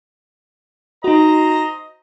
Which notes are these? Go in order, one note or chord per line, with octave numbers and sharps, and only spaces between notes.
D#4 F#4 C5 D#5 A#5